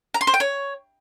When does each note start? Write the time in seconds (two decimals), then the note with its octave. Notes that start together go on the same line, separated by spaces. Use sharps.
0.14 A#5
0.21 C6
0.27 C5
0.34 G5
0.40 C#5